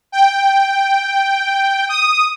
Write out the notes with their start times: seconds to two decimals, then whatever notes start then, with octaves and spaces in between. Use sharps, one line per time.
0.12 G5
1.89 D#6